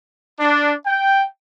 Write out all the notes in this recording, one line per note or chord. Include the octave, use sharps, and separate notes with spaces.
D4
G5